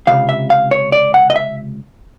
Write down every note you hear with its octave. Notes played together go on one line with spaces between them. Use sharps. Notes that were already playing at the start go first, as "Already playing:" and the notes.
C#2 C3 F5
E5
F5
C#5
D5
F#5
D#5
E5